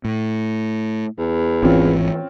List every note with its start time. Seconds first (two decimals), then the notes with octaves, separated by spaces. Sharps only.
0.05 A2
1.18 E2
1.62 G#1 E3 C4 C#4 F4